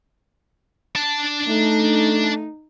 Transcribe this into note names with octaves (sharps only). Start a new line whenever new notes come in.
D4 A5
A3 D#4